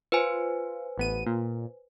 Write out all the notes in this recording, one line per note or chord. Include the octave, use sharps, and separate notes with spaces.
F4 B4 C5 G#5
A1 B3 D#7
A#2